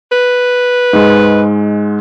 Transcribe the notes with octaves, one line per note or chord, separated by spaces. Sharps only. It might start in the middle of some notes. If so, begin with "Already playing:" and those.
B4
G#2 G#3